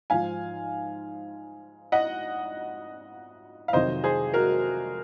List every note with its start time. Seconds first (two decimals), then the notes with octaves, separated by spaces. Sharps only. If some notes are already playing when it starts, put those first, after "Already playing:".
0.10 G#2 F3 F5 G#5
1.92 D#5 F#5
3.68 F5
3.73 F2 C3 D#3 F#3 C5 D#5
4.04 G#4 C5
4.34 F#4 A#4